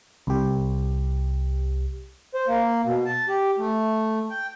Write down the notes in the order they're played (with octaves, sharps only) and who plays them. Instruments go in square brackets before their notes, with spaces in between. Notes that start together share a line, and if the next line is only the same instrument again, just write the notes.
[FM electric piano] C2 G4
[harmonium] C5
A#3
B2
A5
G4
A3
G5